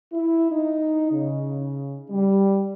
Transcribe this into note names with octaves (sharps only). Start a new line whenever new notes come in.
E4
D#4
C#3
G3